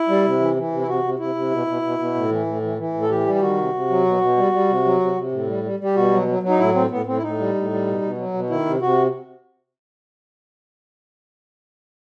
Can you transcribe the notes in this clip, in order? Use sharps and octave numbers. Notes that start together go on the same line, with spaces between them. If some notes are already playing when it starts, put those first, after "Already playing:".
Already playing: E4
G3
C3
E3
E3
C3
E4
C3 F#4
C3
C3 E4
C3
B2
B2
B2
B2
A2
E3
A2
E3
E3
A2
A4
E3 G4
G3
G4
D#3 F#4
C3
C3
F#3
B2
B2
G3
G3
C3
F#3
C3
C3
A2
G3
G3
G3 G4
B2 F#4
F#3
F#3
F#3
D#4
A2 E4
A2 C4
A2 B3
A2 C4
E4
A2 D#4
G3
A2
G3
B2
B2
F#3
B2
D#3 E4
C3
C3 F#4